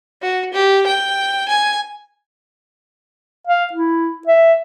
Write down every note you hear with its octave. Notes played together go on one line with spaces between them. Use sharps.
F#4
G4
G5
G#5
F5
E4
E5